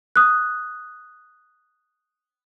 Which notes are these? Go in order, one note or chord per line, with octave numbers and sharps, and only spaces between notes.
D#6 F#6